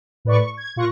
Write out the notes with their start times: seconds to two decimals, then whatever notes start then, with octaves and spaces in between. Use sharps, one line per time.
0.25 A2 B4 D5 C#6
0.40 C#6
0.57 G#6
0.76 A#2 F4 C#6 F#6 A#6